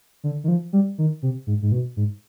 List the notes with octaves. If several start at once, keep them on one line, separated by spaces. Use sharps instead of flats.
D3
D#3
F3
G3
D#3
C3
G#2
G#2
B2
G#2